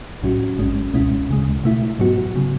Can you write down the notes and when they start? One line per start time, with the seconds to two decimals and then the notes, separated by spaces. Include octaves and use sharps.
0.22 B1 A2 F#3 C#4 F#4
0.58 A1 G#2 G#3 C#4
0.93 C#2 B2 G#3 C#4 E4
1.29 D2 C#3 G#3
1.64 B2 A3 E4
1.99 G#2 F#3 B3 F#4
2.36 C#3 F#3